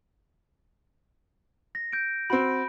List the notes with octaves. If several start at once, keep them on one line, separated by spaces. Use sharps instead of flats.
A#6
G6 D7
C4 F#4 B5 D7